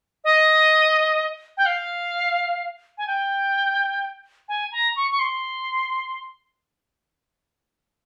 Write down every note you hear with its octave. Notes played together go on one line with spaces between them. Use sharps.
D#5
G5
F5
G#5
G5
G#5
A#5
C#6
C#6
C6